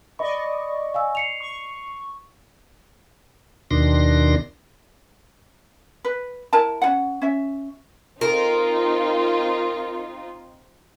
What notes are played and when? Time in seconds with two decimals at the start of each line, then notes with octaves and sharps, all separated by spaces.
0.19 D5 D#5 B5 C#6
0.94 F5 G#5 E6
1.15 C7 C#7 F7
1.41 C#6
3.71 D#2 B2 D#3 D4 C6 A#6
6.05 B4
6.53 E4 A#4 A5
6.82 C#4 F4 F#5
7.22 C#4 E5
8.21 C4 D#4 F4 A#4